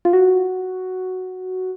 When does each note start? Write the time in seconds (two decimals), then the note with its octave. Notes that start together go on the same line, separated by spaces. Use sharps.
0.05 F4
0.13 F#4